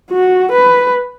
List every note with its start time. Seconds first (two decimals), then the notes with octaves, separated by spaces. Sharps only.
0.11 F#4
0.53 B4